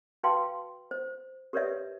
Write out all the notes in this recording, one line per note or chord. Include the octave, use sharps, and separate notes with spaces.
F#4 B4 F5 G5 A5 C6
C5
G4 A#4 B4 C#5 D5 E5